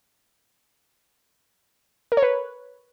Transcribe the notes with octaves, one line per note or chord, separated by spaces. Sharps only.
A#4
C#5
B4